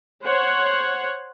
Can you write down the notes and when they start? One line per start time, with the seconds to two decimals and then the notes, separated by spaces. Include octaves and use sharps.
0.24 C5 C#5 F#5